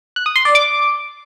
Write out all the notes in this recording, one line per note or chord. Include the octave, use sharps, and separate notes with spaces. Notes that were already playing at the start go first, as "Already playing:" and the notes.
F#6
D#6
C6
D5
D6